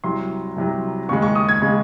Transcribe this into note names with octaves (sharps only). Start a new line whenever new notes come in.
C2 C3 F#3 C6
C2 C3 F#3
D#2 C#3 G#3 C#6
C#6
D#6
G#6
C#3 G#3